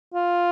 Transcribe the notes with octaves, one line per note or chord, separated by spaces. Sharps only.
F4